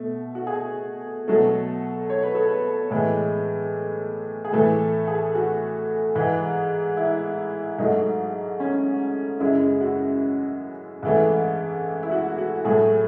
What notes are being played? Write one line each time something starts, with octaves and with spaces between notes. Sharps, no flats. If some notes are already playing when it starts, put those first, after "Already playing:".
Already playing: B2 A3
F#4
G#4
B2 F#3 A3 A4
C#5
B4
A4
B4
A2 E3 G#3
G#4
A2 E3 A3 A4
G#4
F#4
G#2 E3 G#3
E4
G#2 F#3 A3 D#4
C#4
F#2 C#3 G#3 E4
F#4
G#2 E3 A3
E4
F#4
F#4
A2 F#3 A3 G#4